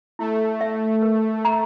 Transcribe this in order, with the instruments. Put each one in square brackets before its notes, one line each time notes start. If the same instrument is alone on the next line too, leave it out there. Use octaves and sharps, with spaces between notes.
[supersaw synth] A3 [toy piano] E4
[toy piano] E5
A#4
A#5